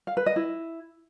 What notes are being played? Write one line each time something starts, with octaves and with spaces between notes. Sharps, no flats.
F5
B4
D#5
E4